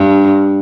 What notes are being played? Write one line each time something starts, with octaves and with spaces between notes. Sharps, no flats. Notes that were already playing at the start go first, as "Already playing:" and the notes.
Already playing: G2